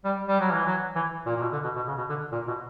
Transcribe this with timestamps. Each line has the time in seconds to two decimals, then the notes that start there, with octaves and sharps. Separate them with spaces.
0.04 G3
0.27 G3
0.40 F#3
0.52 E3
0.65 F#3
0.95 E3
1.26 A#2
1.36 A#2
1.41 B2
1.52 D3
1.64 B2
1.76 B2
1.87 C#3
1.98 B2
2.09 D3
2.32 A#2
2.48 B2